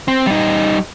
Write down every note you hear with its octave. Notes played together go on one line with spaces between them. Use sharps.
C4
G3 D#4